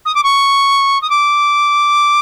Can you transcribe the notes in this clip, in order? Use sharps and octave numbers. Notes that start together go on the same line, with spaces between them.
D#6
D6
C#6
D#6
D6